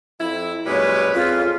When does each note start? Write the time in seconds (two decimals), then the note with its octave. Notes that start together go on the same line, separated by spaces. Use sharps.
0.20 F2 E4
0.67 F#2 A#2 G3 G#3 B4 C#5
1.15 F2 C4 F4 G#4